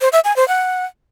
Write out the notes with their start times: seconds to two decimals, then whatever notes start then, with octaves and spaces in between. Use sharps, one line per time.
0.01 C5
0.13 E5
0.24 G#5
0.36 C5
0.48 F#5